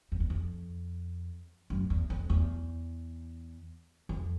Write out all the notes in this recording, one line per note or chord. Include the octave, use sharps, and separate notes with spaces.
F2
E2
F2
F#2
E2
F2
E2
F2